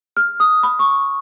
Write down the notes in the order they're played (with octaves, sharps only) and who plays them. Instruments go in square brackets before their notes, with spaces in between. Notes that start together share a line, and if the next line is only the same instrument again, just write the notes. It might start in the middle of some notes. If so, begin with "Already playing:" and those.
[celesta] F6
D#6
B5
C#6